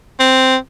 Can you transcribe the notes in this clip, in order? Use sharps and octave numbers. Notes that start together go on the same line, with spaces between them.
C4